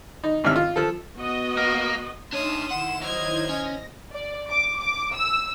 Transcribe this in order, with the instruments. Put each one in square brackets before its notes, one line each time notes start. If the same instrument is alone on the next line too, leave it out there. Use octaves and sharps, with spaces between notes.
[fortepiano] D#4
A1 G#2 C3 E5 F6
F4
F3 A4
[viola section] B3 F#4 D#5
[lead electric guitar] A#3
[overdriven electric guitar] D4 C#5 [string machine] D#4 E5 F6 [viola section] C6 [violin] D#6 E7
[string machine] D#3 E4 [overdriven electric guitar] F#5 [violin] E7
[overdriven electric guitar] F#3 [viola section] C5 D#5 [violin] F6 G#6
[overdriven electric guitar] C#4 [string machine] A#6
[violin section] D5
D6
D6
E6